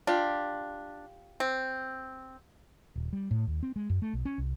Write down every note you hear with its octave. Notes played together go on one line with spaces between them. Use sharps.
D4 F4 G4
C4
D#1
G3
A2
D#2
C4
G#3
F#2
A3
B1
C#4
C2